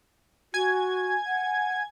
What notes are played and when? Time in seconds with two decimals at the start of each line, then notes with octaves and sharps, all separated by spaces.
0.54 F#4 G#5 G#6
1.26 F#5